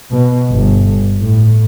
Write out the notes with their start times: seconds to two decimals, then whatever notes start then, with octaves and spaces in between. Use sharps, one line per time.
0.11 B2
0.48 G1
1.21 A2